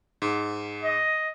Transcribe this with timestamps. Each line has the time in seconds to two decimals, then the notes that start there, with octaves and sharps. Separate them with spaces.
0.22 G#2
0.83 D#5